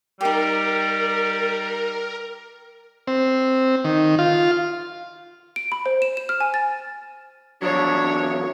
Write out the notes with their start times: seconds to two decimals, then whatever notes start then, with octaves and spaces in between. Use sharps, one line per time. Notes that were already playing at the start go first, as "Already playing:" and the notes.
0.21 G3 D#4 G4 A#4
3.07 C4
3.85 D#3
4.19 F4
5.56 D7
5.72 B5
5.86 C5
6.02 E7
6.17 E7
6.29 F6
6.40 G#5
6.54 A6
7.62 E2 F3 F#3 D4 C#5